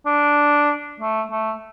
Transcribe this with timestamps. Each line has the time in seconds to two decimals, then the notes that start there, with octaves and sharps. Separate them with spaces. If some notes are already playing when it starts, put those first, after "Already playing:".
0.06 D4
1.00 A3
1.31 A3